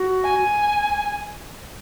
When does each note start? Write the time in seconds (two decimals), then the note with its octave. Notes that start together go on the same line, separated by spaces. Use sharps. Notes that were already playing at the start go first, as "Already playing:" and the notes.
Already playing: F#4
0.24 G#5